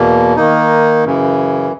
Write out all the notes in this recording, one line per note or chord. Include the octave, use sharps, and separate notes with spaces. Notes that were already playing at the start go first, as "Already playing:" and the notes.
Already playing: E2 B2 A#3
D#3 A#3 D#4
F#2 C#3 E3